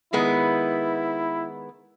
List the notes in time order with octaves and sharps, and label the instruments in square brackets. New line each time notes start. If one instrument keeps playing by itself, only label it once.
[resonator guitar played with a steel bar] D#3 G#3 B3 [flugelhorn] E4